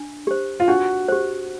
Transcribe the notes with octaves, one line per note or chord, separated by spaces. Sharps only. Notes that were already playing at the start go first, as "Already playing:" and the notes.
Already playing: D4
G4 C5
F4
D4 F#4
G4 C5